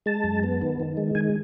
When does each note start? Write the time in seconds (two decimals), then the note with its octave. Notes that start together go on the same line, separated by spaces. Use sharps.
0.06 G#3 A5
0.24 F#2
0.43 B3
0.62 D#3
0.80 D#3
0.97 G#3
1.15 D#3 G#5